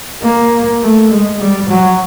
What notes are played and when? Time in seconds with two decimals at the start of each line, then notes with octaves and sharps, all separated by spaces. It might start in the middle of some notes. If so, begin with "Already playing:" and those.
0.22 A#3
0.82 A3
1.10 G#3
1.40 G3
1.69 F#3